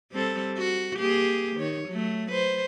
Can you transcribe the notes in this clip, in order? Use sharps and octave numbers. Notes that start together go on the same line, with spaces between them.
G3 C4 A4
F#4
A#3 G4 G#4
D#3 C#5
F#3 A3
B4 C5